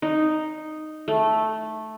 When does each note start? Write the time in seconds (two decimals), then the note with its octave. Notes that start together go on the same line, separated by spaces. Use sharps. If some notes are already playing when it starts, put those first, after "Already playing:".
0.02 D#4
1.08 A3